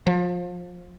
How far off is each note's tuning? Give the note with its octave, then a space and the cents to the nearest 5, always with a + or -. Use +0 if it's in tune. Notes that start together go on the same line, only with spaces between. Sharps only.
F3 +25